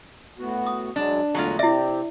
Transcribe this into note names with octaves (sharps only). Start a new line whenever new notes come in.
A2 B3 F#4
D#6
F#2 F#3 G#3 D4
E2 A2 D3 F#3 G#3 F4
C3 C4 E4 G4 D5 E5